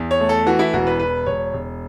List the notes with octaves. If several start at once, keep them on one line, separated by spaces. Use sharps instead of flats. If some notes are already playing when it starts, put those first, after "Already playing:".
Already playing: E2
C#5
A3
A4
E3 F#4
E4
E1 F#4
B4
E1 B4
E1 C#5
E1